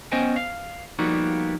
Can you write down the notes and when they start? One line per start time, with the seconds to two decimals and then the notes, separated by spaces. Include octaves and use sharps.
0.12 B3 C#4 C5 D#5 G5 G#5
0.36 F5
0.99 F3 G3 A#3 B3 D#4 F#4